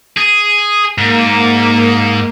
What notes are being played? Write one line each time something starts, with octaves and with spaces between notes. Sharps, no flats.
G#4
G#2 A#3